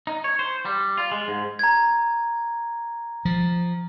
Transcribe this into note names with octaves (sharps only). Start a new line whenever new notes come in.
D#4
C#5
C5
G3
F4
G#3
G#2
A#5 G#6
F3